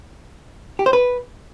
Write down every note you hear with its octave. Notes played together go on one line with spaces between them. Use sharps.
G4
C5
B4